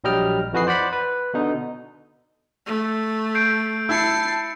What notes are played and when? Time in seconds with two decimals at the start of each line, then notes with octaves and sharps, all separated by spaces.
0.04 A#1 F#3 G3 D#5 G5 F6
0.53 F2 E3 F#4 B4 D#5 C7
0.67 C5 D5 F#5 B5
0.93 B4
1.34 B2 D3 D#4
2.66 A3
3.35 G6 C7 D7
3.89 E4 A5 E6 C7 C#7